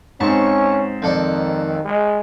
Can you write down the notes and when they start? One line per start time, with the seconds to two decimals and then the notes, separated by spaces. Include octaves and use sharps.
0.20 G#2 C4 C#4 A5 C#6
1.02 F2 D#3 A4 D5
1.85 G#3